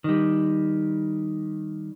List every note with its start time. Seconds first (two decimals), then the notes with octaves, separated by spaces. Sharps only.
0.04 D#3 G3